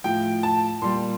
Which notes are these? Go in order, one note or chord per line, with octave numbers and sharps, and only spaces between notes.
A2 F3 G5
A5
A#2 G3 C6